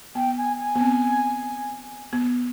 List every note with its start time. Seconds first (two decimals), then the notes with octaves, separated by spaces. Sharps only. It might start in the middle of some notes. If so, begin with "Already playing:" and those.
0.15 B3 G5
0.37 G#5
0.59 G#5
0.75 B3
0.81 C4
2.13 B3